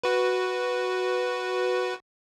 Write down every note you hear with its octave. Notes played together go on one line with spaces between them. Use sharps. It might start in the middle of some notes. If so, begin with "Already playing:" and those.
F#4 B4